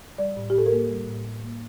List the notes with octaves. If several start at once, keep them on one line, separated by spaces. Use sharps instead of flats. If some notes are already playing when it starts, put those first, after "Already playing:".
G3 D5
A2
G4
A2 A4
A#4
A#3
G3
A2
A2
A#3